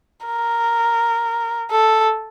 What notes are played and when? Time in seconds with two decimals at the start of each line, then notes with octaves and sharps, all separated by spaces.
0.26 A#4
1.70 A4